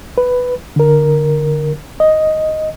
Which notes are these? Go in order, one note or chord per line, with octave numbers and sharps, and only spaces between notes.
B4
D3 A#4
D#5